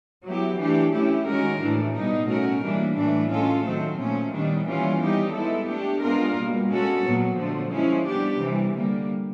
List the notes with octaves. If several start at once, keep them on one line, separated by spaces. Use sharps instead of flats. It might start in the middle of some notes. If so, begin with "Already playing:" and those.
F#3 B3 E4 G4
E3 A3 D4 G4
A3 C#4 E4 G4
D#3 G#3 C#4 F#4 A#4
A2 E3 A3 D4
B2 G3 B3 D#4
A3 C#4 F#4 A#4
E3 G3 A#3 D4
A2 E3 A3 D4
G#3 C#4 F4 A4
D#3 F#3 A3 C4
A#2 F3 A3 C#4
D#3 G3 B3 D4
E3 G3 A#3 C#4 F4
G3 B3 D#4 G4
G#3 B3 E4 A4
A3 D4 G4
G#3 B3 D4 F4 A#4
B2 G3 A#3
G#3 C#4 F#4 A4
A#2 F#3 B3
D3 F3 A3
F3 G#3 C#4 E4
G3 B3 D4 G4
C3 E3 G3
D3 G3 A#3